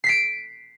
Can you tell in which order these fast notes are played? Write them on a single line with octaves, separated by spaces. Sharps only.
C7 B6 D7